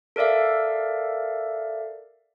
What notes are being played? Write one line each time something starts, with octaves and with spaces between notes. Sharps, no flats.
A4 A#4 D5 E5 F5